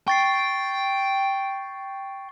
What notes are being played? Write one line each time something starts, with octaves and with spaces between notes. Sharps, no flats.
G5 C#6 A6 C7